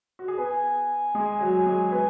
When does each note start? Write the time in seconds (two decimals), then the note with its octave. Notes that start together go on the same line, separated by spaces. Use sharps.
0.19 F#4
0.28 G#4
0.38 B3 B4 G#5
1.15 G#3 G#4
1.41 F#3 F#4
1.66 G#3 G#4
1.92 B3 B4